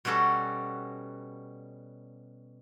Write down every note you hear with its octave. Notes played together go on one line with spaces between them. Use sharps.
B2 G3 C#4 F#4 A4